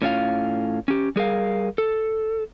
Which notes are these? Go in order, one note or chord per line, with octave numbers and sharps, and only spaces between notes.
A2 C#4 F4 F5
C#4 G4
G3 G#4 A#4 F5
A4